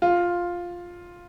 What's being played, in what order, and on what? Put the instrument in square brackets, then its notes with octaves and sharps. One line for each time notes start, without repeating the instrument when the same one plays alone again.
[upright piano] F4